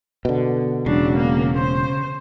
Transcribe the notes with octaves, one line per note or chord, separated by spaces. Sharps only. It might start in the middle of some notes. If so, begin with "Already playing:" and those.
B2 D3
E1 C#3 F#3 D4
A#3
C5